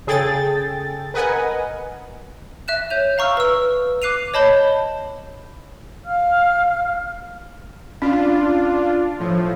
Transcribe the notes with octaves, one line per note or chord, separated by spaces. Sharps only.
C#3 G#4 A4 G5 A6
A#4 B4 D#5 F#5 G#5
E5 F#6 E7
C#5 G6 D#7 F7
F5 A#5 C#6 E6 F6
B4 E6
D6 F#6 C7 D#7 F7
C#5 D#5 A5 B5 G6 G7
F5 F6
C#4 D4 F4
A2 F3